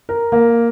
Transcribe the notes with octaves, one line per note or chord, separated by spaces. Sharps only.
A#4
A#3